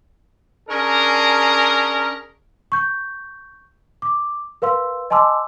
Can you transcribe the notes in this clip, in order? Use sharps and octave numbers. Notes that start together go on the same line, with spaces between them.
C#4 D4 G#4 A#4
C#6 G6
D6
A#4 B4 F5 C6 E6
D#5 G#5 A5 C6 D6 E6